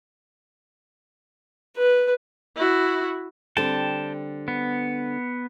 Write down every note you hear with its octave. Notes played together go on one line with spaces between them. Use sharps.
B4
E4 F#4
D3 G3 C4 G5 A5
B3